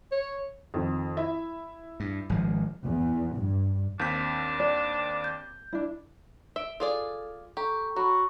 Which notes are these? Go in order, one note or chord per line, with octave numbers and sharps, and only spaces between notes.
C#5
F2 D#3
E4 E5
G2
G#1 F3 G#3
E2
G2
D#2 C4 D4 G6 B6
D5
G6
D4 E4
E5 D7 G7
F4 G#4 A4 D5
G4 A4 A#5 C#6
F#3 F#4 A#5 B5